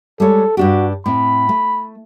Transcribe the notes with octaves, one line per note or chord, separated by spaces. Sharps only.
G3 G#3 A4 C#5
G2 D4 F#4 G4
A2 C4 B5
A3